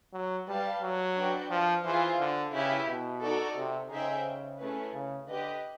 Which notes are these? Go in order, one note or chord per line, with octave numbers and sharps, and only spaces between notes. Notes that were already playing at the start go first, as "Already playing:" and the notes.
F#3
G3 G4 B4 D5 F5 A5
F#3
D4 F#4 B4 D5 G5
F3
E3 F4 G#4 C5
D3
C#3 E4 G4 B4 E5
B2
D#4 F#4 A4 D5
C3
C#3 D#4 G#4 C5 E5 G5
A3 C#4 E4 G#4 B4
C#3
D3 G4 B4 D#5